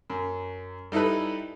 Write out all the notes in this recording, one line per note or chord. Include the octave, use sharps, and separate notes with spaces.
F#2
G3 D#4 E4 A4 B4